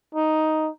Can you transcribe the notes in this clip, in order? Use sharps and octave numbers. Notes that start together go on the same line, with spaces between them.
D#4